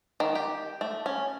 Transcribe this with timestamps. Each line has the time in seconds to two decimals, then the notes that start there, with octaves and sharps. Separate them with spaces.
0.20 D#3
0.35 G4
0.81 A3
1.06 C#4